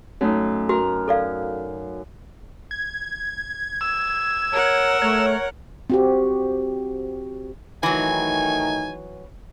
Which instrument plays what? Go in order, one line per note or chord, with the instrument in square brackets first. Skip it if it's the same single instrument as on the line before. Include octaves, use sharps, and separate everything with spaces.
[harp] F#2 A3 D#4
[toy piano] F#4 [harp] A#4
[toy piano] A4 D5 F5
[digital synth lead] G#6
[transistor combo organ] E6
[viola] A#4 F#5 [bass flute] C#5
[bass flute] A3 [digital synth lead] C#5
[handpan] C4 F#4 G4
[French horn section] D#3 A3 D#4 [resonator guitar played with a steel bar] E3 F#3 [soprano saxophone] G#5